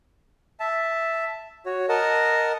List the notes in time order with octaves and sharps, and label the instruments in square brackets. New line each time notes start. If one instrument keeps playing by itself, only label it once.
[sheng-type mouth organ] E5 A5
F#4 C#5
A#4 D#5 F#5 A5